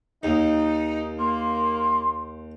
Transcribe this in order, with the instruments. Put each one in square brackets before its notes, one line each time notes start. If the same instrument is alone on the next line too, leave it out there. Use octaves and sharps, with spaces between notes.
[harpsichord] D#2 [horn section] D#4
[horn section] A#3 [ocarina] C6